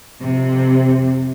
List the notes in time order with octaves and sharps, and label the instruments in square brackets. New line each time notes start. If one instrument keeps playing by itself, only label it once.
[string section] F2 C3